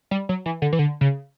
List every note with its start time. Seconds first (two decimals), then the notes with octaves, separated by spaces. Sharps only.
0.11 G3
0.29 F#3
0.46 E3
0.62 D3
0.73 E3
0.79 D3
1.01 C#3